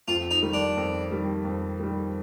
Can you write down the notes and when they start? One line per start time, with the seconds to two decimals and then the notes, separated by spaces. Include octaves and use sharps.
0.08 F2 F4
0.31 D#4
0.42 D#3 G3
0.53 D4
0.77 F2
1.11 D#3 G3
1.45 F2
1.79 D#3 G3